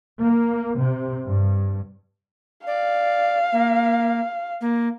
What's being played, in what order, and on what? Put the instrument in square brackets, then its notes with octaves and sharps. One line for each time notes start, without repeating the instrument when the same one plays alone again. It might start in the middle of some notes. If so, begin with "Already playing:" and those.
[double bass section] A#3
C3
G2
[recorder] D5 [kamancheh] F5
[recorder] A#3
A#3